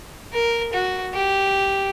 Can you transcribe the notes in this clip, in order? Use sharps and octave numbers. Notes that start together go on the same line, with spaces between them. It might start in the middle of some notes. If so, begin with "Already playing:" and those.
A#4
F#4
G4